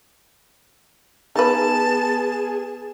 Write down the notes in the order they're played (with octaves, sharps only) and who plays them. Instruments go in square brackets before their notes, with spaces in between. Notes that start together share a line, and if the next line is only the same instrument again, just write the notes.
[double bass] B3 [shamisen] D#4 B4 [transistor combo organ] G#4 [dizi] A5